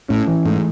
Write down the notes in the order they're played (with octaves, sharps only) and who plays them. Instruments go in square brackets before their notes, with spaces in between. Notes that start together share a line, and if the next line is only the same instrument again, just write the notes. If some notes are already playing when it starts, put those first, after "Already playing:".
[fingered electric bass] A2 [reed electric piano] C#4
[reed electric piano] E3
[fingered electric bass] G#2 [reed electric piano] A3